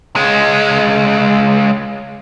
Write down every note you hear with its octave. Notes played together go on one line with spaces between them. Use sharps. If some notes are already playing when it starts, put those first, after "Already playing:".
C#2 G#3